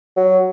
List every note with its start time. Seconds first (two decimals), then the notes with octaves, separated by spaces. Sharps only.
0.16 F#3